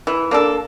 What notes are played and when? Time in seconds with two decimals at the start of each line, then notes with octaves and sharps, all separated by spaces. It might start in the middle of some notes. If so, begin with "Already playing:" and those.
0.07 E3
0.31 A#3 D4 A4